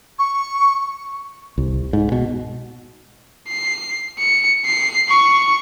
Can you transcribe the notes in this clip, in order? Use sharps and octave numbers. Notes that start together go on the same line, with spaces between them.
C#6
C2
G#2
B2
C7
C#7
C7
C#6